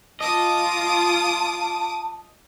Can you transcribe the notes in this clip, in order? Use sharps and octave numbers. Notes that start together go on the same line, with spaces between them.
F4 D#5 A5 D6 D#6